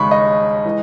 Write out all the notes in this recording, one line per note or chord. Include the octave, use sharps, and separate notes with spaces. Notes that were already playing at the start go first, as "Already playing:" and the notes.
Already playing: D#2 C#3 G#3 B5 C#6
D#5
E3 G#3